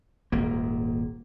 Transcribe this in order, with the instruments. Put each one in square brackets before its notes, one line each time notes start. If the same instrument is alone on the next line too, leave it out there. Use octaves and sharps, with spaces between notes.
[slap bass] D#1 G#1 A#3